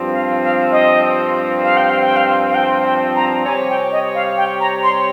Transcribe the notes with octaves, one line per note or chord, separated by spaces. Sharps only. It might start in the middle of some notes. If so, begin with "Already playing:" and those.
Already playing: G2 F3 C4
F5
F5
D#5
F5
G5
F5
G5
F5
F5
G5
G5
A#5
C3 G3 C4 G4 C#5 G#5
G5
D#5
F5
G5
A#5
C6